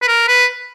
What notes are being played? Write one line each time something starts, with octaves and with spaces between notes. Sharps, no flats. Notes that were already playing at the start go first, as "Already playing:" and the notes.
B4
A#4
B4